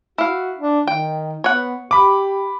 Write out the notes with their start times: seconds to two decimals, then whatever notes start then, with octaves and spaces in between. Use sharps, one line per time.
0.18 E4 F#4 F5
0.59 D4
0.87 D#3 G5
1.44 B3 C#5 F#5
1.91 G4 B5 D6